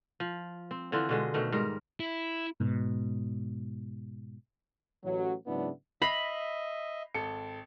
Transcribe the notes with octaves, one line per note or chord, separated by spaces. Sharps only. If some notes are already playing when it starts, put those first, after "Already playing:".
F3
C4
D3 E3 C4 F4
B2 D3 G#3
B2 D#3 A3
G#2 G3 A#4
E4
G#2 B2
A1 F#3
G#2 C#3 F#3 B3 D4 E4
D#5 E5 B5 A#6 C7 F7
G#1 A4 C#7